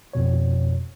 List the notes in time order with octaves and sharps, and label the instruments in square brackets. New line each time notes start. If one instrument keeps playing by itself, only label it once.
[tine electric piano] F2 B2 C#5